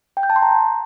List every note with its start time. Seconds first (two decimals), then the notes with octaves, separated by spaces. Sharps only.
0.17 G5
0.23 G6
0.30 A5
0.36 C6
0.42 A#5